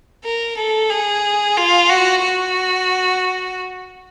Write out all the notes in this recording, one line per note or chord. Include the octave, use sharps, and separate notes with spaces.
A#4
A4
G#4
F4
F#4
F#4